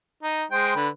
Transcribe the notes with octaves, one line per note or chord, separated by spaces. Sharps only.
D#4
G#3 C5 G5
D3 B4